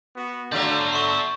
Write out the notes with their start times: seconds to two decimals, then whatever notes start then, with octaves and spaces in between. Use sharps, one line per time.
0.16 B3 F#4
0.52 D3 F#3 A3 D5 F5 A#5 G6
0.93 A4 E5 C6 C#6